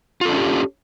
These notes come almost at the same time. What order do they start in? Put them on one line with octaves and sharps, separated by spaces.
F4 A4 D4 C#4 G4